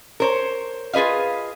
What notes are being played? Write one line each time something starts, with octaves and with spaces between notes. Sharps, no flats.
A#4 C5 C#5
F4 G#4 B4 D#5 F5